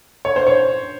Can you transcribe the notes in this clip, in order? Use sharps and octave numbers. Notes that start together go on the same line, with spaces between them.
C#5
C5
C#5